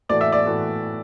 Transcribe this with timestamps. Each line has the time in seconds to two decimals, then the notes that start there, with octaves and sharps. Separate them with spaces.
0.09 A2 E3 A3 F#4 A4 D5
0.21 E5
0.32 D5
0.45 A2 E3 A3 F#4 A4